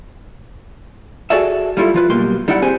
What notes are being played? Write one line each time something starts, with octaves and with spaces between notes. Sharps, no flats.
F#4 G#4 A4 D5 E5
G3 A3 E4 F4 A4
F3 F4 B4
B1 B2 G3 A#3 C6
G3 D#4 E4 D5 F#5
C4 G4 G#4 C5 G#5